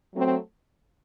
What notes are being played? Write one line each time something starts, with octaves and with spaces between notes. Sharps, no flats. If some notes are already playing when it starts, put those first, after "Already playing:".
F#3 A3 C4